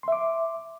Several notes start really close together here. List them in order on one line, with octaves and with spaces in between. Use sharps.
C6 E5 D6